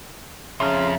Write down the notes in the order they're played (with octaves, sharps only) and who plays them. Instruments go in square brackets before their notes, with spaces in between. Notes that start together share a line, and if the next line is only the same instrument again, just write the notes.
[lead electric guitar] F2 [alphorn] C#3 [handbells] E5 A#5 [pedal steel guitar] C6 F6